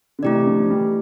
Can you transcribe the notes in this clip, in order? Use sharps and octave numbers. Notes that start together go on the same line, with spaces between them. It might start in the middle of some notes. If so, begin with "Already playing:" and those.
D3
C3 E3 A3 E4 G4 D5
D3 F3
F3
E3 G3